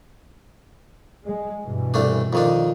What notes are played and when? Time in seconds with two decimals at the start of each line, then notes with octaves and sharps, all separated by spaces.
1.25 G#3
1.64 G2 B2 E3
1.94 C2 A3 D4
2.33 F2 D#3 D4